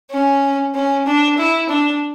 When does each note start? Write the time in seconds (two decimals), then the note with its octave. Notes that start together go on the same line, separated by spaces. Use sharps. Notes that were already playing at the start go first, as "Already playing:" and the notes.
0.11 C#4
0.74 C#4
1.05 D4
1.37 E4
1.68 D4